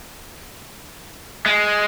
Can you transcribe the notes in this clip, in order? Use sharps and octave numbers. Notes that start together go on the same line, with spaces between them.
G#3